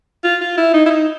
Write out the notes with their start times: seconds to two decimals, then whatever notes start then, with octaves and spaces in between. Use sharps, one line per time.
0.24 F4
0.41 F4
0.58 E4
0.74 D#4
0.86 E4
0.90 D#4